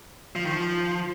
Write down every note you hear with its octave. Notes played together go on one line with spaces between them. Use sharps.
F3
D#3
F3